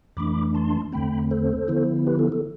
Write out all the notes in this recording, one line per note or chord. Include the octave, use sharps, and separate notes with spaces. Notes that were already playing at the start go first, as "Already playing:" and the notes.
F2 E3 A3 D4 B5 D6
A5 C6
E2 D3 A3 C4 G5 B5
A4 C5
D3 F3 B3 E4
G4 B4
A4
A4